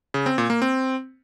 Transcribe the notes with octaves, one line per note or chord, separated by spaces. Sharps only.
C#3
C4
A#2
A#3
C4